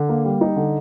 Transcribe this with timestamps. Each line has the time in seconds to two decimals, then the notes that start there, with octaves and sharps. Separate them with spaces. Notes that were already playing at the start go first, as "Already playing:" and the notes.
Already playing: D3
0.09 A#3
0.25 G3
0.41 D#4
0.56 D3